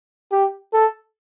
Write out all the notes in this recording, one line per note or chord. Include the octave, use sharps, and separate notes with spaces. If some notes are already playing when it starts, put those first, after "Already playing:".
G4
A4